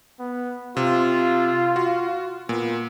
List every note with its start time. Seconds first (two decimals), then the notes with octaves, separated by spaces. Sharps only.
0.19 B3
0.77 C3 F4
1.76 F#4
2.49 A#2 B3